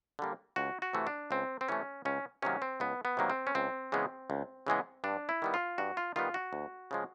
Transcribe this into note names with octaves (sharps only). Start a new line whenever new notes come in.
D3 G3 A#3
C#2 F#4
F#4
C3 E3 A3
D4
C#2 C4
C4
C3 E3 A3 C#4
C#2 C#4
C3 D#3 F#3 A#3 C#4
C4
C#2 B3
B3
C3 D#3 F#3 A#3
C4
C#4
C#2 C4
C#3 E3 G#3 B3
C#2
C#3 E3 G#3 B3
G2 D4
E4
D#3 G3 B3
F4
G2 F#4
F4
D#3 G3 B3 F4
F#4
D2
C#3 F3 G#3